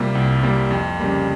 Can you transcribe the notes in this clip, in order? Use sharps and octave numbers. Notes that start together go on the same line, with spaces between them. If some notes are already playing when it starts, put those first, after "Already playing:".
Already playing: C3 G3 A#3 F4
C2
C3 G3 A#3
F2
C#3 G3 A#3